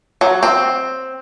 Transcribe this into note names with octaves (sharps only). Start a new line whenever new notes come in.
F#3
C4